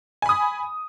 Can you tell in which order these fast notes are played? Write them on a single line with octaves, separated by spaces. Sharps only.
G#5 B5 D#6